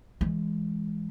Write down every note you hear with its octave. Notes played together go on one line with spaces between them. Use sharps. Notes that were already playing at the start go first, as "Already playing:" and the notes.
E3 G#3